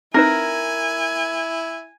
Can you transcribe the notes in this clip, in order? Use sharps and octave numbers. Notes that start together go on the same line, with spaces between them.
C4 D#4 E4 A#4 B4 G#5